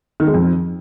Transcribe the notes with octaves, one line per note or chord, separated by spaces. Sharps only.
D#3
G#3
F2